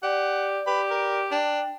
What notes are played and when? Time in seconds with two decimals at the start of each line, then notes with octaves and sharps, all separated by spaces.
0.03 G4 D5 F#5
0.67 G4 B4
0.90 A#4
1.32 D4 G5